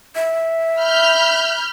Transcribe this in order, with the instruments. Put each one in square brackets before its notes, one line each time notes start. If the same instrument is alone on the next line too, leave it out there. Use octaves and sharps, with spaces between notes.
[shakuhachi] E5
[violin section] B5 F6 G6